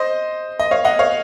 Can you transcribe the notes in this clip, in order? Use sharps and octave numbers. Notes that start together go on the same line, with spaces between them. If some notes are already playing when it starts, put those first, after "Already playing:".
Already playing: C5 D#5
D#5
C#5 F5
D#5 F#5
C#5 F5